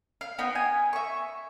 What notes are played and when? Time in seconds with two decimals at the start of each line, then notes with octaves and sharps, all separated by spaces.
0.21 F5
0.39 B3 D#4 G5
0.55 G#5
0.93 E5 C#6